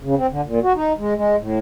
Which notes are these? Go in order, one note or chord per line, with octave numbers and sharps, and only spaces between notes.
C#3
C4
D3
A#2
F#4
D#4
G#3
G#3
A2